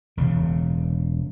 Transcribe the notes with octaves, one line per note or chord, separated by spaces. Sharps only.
E1 C#3